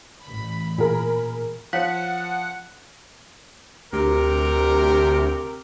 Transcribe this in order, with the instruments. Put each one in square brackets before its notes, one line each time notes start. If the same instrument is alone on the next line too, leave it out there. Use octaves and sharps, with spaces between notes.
[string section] A1 B5
[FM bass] A#2 [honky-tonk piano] G#4 A#4 G#5
[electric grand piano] F3 [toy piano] C5 C#5 F5 [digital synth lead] F#5
[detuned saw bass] D2 [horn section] C3 G4 A#4